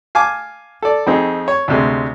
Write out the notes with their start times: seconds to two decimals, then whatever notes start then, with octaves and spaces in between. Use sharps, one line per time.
0.15 F5 G#5 A5 D6
0.83 A4 D5
1.07 F2 C4 D#4 G#4
1.48 C#5
1.68 D2 C3 G#3